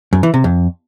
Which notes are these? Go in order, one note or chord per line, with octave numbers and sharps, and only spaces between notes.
F#2
E3
C3
F2